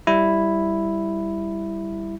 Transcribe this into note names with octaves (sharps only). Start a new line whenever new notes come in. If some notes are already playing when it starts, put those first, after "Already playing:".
G3 E4